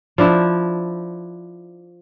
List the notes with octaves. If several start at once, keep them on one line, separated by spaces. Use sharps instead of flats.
F3 D4 E4